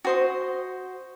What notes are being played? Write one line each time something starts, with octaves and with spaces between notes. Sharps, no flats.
F#4 C5 D#5